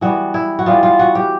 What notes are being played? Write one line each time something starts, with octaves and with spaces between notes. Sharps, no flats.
E3 G3 B3 F#4
E4
F#4
E3 G3 B3 F4
F4
F#4
G4